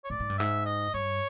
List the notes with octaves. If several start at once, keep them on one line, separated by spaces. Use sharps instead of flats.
C#5
A2 D5
G#2
G2
G#2 E5
D#5
G2 C#5